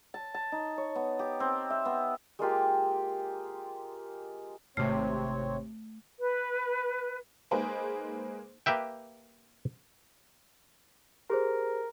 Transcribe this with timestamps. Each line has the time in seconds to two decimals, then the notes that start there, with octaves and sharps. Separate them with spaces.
0.14 A5
0.34 A5
0.52 D#4
0.78 C#5
0.95 B3
1.19 G4
1.40 C4
1.70 E5
1.85 B3
2.39 G#3 A#3 F4 G4
4.77 G#1 C3 A3 C4 C#5 F6
6.19 B4
7.51 G#3 A#3 D#4 G#4 B4 C5
8.66 A#3 G4 B4 E5 G5
11.30 G4 G#4 A#4 C5